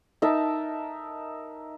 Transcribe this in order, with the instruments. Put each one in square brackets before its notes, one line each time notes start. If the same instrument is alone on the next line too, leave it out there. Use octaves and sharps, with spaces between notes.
[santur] D#4 A#4 E5 A5